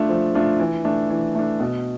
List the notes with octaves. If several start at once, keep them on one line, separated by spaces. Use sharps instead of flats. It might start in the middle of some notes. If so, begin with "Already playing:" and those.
Already playing: A3 D4 F4
F3
A3 D4 F4
E3
A3 D4
E3
A3 D4
B2